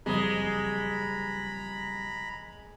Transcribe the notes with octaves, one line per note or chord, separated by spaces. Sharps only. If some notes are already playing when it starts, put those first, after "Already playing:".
F#1 F2 G3 G#3 A#5 B5 D#6